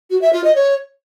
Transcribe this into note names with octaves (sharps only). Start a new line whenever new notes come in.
F#4
E5
F4
D#5
C#5